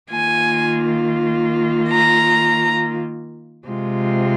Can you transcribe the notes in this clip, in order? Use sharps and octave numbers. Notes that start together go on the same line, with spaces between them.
D#3 A#3 F4 G#5
A#5
C3 G#3 F4